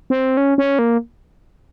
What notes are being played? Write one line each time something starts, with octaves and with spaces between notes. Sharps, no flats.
C4
C#4
C#4
A#3